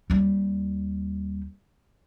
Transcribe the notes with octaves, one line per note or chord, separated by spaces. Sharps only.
D#2 G3